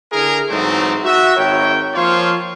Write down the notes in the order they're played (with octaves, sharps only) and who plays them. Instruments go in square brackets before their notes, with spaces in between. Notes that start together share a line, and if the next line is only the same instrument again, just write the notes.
[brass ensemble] D3 E4 G#4 A#4
G#2 E3 F#3 A3 C4 D#4
F#4 E5
G#1 A#4 C#5 G5
F3 A#3 F4 C5 C#5 F5